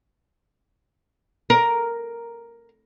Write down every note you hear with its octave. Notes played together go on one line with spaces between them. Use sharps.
A#4